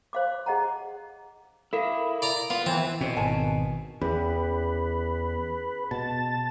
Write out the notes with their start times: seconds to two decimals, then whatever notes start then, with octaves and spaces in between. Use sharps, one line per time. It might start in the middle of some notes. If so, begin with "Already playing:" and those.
0.13 C5 F5 D6
0.46 G#4 D#5 F#5 A#5
1.73 E4 A4 A#4 F5
2.22 D5 A#5
2.50 B3 F4
2.66 E3 C4
3.01 B2 C#4 E4 C5
3.16 G#1 A#4 G#5 A5
4.01 E2 C#4 G#4 B4
5.91 B2 A5